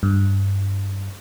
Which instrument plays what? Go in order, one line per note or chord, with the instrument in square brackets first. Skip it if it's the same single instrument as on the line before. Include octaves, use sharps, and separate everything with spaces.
[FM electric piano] G2